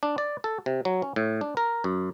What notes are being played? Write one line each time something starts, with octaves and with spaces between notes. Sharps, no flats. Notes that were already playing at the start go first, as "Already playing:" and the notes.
D4
D5
A4
C3
F#3
C#4
A2
D4
A#4
F#2